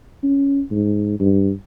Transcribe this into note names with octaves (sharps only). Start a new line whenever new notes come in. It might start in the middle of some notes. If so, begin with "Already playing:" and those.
C#4
G#2
G2